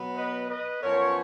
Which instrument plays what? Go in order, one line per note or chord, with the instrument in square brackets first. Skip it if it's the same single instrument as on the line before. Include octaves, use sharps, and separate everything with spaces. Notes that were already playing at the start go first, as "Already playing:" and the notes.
Already playing: [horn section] B2 F#3 B3
B4 D#5
B4 D#5
F#2 F3 B3 A#4 C#5